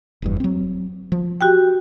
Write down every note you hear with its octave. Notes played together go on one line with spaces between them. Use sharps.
F1 E2 G2
F#3 C4
F3
F#4 G4 G5